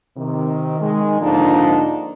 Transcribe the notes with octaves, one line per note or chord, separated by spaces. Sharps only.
C3 D#3
D#3 G#3
G#2 D3 F3 A#3 D4 D#4